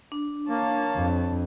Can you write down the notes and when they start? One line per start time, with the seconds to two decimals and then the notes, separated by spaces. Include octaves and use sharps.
0.12 D4
0.49 A#3 C#5 A5
0.97 F2